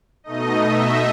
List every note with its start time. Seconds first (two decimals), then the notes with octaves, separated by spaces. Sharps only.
0.24 B2 A3 D#4 D#5
0.64 E5